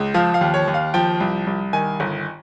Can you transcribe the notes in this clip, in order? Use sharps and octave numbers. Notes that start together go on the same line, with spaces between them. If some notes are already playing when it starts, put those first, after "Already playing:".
Already playing: C#2
F3 F5
F5
D#2
C#5
D#2
F5
F3 G5
C2
C2
D#3 G#5
G1